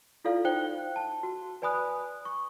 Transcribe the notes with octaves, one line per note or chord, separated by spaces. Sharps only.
E4 F4 A4 D5 F5
D#4 C5 G5 F#6 G7
A5
F#4
B4 D5 G#5 B5 D#6 F#6
C#6